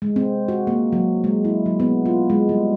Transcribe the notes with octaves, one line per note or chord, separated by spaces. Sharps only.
G#3
C4
F#4
A#3
F#3
G#3
E4
F#3
B3
F4
G#3
G3